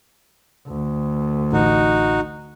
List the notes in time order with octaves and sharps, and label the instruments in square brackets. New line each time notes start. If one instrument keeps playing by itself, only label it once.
[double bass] D2
[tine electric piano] A1 [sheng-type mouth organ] D#4 F#4